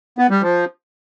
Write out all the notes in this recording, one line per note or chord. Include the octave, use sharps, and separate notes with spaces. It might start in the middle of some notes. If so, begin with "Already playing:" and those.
B3
G3
F3